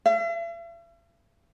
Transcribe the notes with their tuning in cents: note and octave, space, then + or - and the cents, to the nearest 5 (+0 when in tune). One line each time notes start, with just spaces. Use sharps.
E5 +45